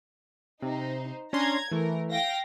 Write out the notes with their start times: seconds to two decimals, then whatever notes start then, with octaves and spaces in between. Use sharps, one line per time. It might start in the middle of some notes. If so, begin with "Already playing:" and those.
0.62 C3 D#4 C5
1.33 C#4 D4 A#5 C6 G#6
1.71 E3 A3 A#4
2.12 F5 G5 A#6